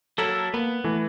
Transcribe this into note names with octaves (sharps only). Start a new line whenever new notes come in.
F#3 A#3 E4 A4
A#3 B3 B5
E3 A3